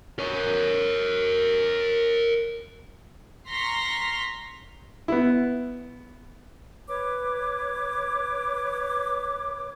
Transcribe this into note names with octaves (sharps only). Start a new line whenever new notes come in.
A#4 C#5
A#5 C6 C#6 F6 A#6 B6
B3 E4
B4 C#5 D6